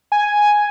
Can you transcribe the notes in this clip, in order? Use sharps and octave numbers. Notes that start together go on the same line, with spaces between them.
G#5